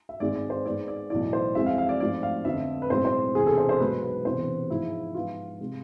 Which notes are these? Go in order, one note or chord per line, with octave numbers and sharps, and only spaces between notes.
E5
G#1 G#2 G#3 D5
D5
C5
G#2 G#3 B3 D5
D5
B1 A2 E3 D5
C5
F2 E3 G#3 C4 E5
F5
F5
D5
G#2 F3 A3 C4 D5
F5
F2 D3 F3 B3 E5
B4
B1 A2 G#3 C4 C5
C5
E1 E2 C3 G#4
A4
C5
C5
B1 B2 G#3 B3 B4
B4
E1 E2 C3 C5
G#2 F3 G#3 E4
G#2 F3 B3 F4
C3 G#3